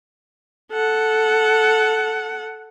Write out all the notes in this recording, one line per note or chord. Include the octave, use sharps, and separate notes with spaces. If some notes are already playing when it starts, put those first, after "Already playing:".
A4 F#5